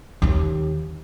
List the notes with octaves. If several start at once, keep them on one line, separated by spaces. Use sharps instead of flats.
D#2 D#3